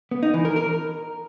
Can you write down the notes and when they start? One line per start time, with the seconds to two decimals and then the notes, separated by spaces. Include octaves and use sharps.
0.11 B3
0.23 D#4
0.34 E3
0.45 A#4
0.56 A#4